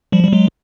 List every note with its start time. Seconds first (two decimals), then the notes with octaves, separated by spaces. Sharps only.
0.12 F3 G3
0.24 G3
0.33 F#3 G#3